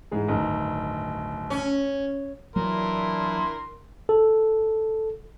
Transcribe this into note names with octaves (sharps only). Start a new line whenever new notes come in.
G#2 E3 G#4
D1 G1 D#3 D#4
C#4
E3 F#3 A#3 D4 E4 A#4 C6
A4